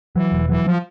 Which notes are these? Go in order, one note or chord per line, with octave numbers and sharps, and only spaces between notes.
E3 F#3
E1
E3 F#3
F3